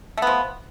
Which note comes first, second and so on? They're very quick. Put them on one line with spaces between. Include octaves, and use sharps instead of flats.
A3 B3 F3